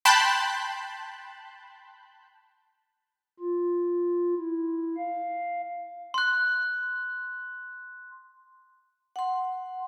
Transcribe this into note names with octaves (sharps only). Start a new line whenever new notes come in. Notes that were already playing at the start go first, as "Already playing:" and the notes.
G5 A5 B5 C6 F#6 G6
F4
E4
F5
C6 F#6
F#5 C6